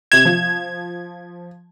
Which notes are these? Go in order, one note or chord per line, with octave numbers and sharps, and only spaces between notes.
C3 G#6 E7
F3